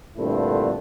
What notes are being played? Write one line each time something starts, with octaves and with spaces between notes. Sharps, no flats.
G2 A#2 D3 A3 C4 E4